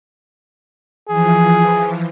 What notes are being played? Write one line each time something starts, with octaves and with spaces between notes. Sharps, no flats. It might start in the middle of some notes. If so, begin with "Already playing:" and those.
E3 F3 G#4